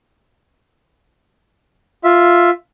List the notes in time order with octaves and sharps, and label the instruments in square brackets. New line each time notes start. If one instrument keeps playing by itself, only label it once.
[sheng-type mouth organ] F4 E5